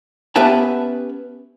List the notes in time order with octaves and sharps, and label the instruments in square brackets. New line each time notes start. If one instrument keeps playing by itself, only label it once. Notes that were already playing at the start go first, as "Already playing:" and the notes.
[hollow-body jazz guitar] B3 C#4 G4 B4 E5 A5